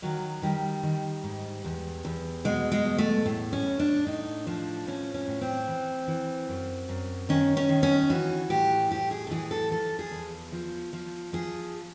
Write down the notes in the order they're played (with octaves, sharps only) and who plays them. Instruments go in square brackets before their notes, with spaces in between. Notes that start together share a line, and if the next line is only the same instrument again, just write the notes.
[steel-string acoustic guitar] D#3 F#3
D#3 G3
D#3
G#2
E2
E2
B2 G#3
G#3
E2
A3
A2
C#4
A2
D4
A2 D#4
F3 D4
A2 C#4
C#4
A2
C4
E3
E3
F#2
F#2
D#3 C#4
C#4
D#3
C#4
E3 F#4
A2 G4
A2 G4
G#4
A4
E3 G#4
A4
F3 A4
G#4
E2
F3
F3
F3 G#4